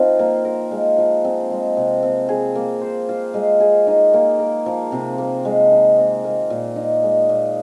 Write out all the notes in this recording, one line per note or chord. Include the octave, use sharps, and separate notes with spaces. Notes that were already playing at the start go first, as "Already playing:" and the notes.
Already playing: F3 C4 D#4 F4
A#3
A#4
G#3
F3
C4
G#3
C3
C4
G#4
A#3
C5
F4
G#3
G#4
D#4
A#3
A#4
F3
C3
A#3
G#3
D#3
C4
A#3
A#2
D#4
G#3
A#2